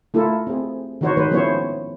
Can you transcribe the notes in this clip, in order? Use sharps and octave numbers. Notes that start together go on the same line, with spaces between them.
A3 E4 F4 A4 A#4
C4 G#4
D#3 E3 D#4 F#4 C5 C#5
D#3 G#3 B4 C5
F3 B3 C#4 E4 C5 C#5